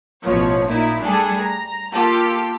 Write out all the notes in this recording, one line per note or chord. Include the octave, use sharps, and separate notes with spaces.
A1 B2 F3 C#5
A#2 D#4 E4
G3 A3 D4 G#4 A4
A#5
A#3 F4 G4 A4